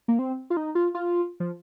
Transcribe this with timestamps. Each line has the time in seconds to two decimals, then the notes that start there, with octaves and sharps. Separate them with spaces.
0.08 A#3
0.19 C4
0.50 F4
0.57 D#4
0.75 F4
0.95 F4
1.40 F3